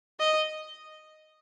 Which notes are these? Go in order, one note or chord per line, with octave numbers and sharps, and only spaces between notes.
D#5